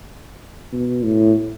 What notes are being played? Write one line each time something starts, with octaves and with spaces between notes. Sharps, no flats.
B2
A2